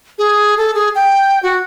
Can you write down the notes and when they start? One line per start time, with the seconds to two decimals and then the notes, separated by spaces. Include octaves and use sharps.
0.19 G#4
0.58 A4
0.75 G#4
0.95 G5
1.43 F#4